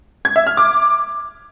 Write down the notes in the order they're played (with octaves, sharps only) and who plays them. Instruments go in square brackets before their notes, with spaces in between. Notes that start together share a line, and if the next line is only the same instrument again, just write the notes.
[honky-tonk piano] G#6
E5
F6
D6